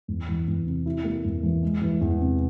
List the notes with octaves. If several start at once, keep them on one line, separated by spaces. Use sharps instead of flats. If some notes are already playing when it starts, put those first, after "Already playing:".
E2
E3
E2
C3
E4
A#3
E2
E3
G#3
E3
E2
C3